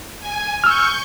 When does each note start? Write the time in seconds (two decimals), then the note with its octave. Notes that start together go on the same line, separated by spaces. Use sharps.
0.21 G#5
0.64 C#6 E6 F6 G6